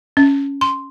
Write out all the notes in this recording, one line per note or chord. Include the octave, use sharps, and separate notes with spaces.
C#4
C6